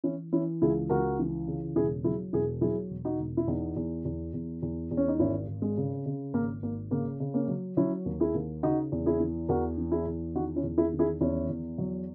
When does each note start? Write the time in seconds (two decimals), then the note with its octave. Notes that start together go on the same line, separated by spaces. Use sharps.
0.04 E3 C#4 E4
0.33 E3 C#4 E4
0.62 C#2 E4 G#4
0.89 C#2 F#4 A#4
1.19 E3
1.48 C#3
1.75 E1 E4 G#4
2.04 F#3 E4 G#4
2.33 E1 E4 G#4
2.61 F#3 E4 G#4
2.90 E1
3.05 D#4 F#4
3.19 E1
3.37 E4
3.48 E2 B3 D#4
3.76 E2
4.05 E2
4.34 E2
4.62 E2
4.91 E2
4.97 C#4
5.08 D#4
5.19 G#1 C#4 E4
5.48 G#1
5.62 G#3
5.77 C#3
6.06 C#3
6.34 G#1 A#3
6.63 G#1 A#3
6.91 C#3 A#3
7.20 C#3
7.34 A#3 C#4
7.48 F#3
7.77 F#3 C#4 E4
8.05 D#2
8.20 E4 G#4
8.34 D#2
8.63 C#3 D#4 F#4
8.92 E2
9.06 E4 G#4
9.20 E3
9.49 E2 F#4 A#4
9.78 E3
9.91 E4 G#4
10.06 E2
10.35 D#3 D#4 F#4
10.56 C#4 E4
10.64 E2
10.77 E4 G#4
10.93 D#3
10.99 E4 G#4
11.21 E2 C#4 E4
11.49 E2
11.78 F#3